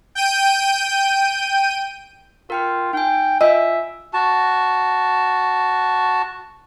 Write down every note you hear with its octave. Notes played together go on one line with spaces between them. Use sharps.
G5 G6 D#7
F4 A#4 G5 F6
D#4 G5 G#5
F4 D#5 E5 G#5 E6
F#4 A5